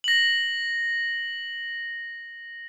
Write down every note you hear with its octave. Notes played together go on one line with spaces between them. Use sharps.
A#6 F#7